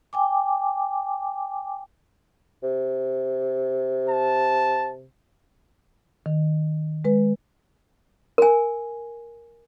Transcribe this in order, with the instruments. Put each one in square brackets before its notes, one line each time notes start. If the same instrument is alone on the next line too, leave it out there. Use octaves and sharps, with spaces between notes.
[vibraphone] G5 G#5 D6
[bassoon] C3
[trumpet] A5
[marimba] D#3
G#3 B4
[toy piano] A#4 G#5